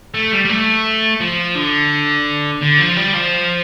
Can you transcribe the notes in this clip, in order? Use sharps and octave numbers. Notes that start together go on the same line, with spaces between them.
A3
G3
G3
A3
F3
D3
D3
F3
G3
F3